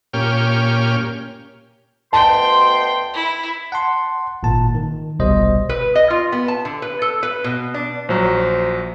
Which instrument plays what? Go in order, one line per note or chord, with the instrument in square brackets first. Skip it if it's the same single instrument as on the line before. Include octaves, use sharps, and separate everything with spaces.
[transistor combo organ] A#2 C#4 G4 F6
[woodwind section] D2 B2 C6 [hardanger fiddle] G5 [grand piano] A5
[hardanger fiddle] E4
[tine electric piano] F#5 A5 C6
G#1 A#2 A5
D#3
G1 C2 B2 G3 C5 D#5
[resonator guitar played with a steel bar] B4
D#5
F4
B3
A5
D3
B4
A4
B4
B2
D4
[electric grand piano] A#1 F#3 [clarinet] C5